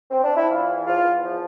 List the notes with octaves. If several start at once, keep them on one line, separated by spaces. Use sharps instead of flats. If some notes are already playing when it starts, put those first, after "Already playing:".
C4
D4
E4
E3 F4
E2
E2 F4
E2
F3